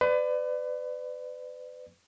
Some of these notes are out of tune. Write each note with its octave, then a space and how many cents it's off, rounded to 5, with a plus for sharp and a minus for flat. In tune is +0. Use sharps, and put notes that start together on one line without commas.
B4 +35 D5 +20